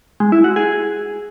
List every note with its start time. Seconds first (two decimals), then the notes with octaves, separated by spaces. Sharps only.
0.20 G#3
0.32 E4
0.44 F#4
0.56 G#4